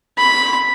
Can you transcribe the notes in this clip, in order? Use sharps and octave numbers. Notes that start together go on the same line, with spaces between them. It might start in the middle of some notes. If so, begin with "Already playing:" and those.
B5